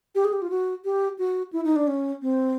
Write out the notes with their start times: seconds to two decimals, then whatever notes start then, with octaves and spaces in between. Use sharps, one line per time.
0.15 G4
0.25 G#4
0.33 G4
0.42 F4
0.50 F#4
0.85 G4
1.19 F#4
1.53 E4
1.64 D#4
1.76 D4
1.87 C#4
2.22 C4